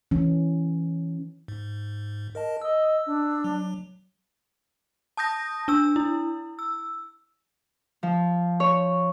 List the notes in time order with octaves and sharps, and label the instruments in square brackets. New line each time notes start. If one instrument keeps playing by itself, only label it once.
[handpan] E3 C#4
[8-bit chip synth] G#2
A#4 D#5 A5
[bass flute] D#5 [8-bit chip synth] E6
[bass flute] D4
[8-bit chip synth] F#3
[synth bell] A5 D#6 G6 A#6
D4 E6
E4
E6
[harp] F3
C#5